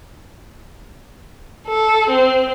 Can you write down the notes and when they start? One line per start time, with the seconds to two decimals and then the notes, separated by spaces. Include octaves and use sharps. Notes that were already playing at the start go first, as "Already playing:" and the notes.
1.67 A4
2.10 C4